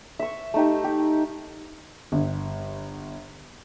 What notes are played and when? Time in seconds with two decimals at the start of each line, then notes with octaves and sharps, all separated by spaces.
0.19 E5 C#6
0.54 A3 D#4 G4
0.84 G4
2.12 G1